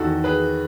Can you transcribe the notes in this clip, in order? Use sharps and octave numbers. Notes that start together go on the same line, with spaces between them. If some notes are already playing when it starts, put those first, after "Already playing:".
Already playing: E2 D#3 F#4 A4
G#4 B4